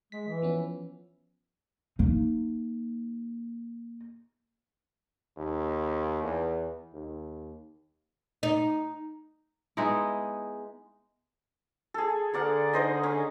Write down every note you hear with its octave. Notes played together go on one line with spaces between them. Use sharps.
G#3 B6
E3
F3 B3 C#4
A#3 D#4
D#2
E2
D#2
D#4
G#3 B3 D#4 E4
G#4 A4
D3 A#4 D5 F#5
D#4 C5 D#5
C#4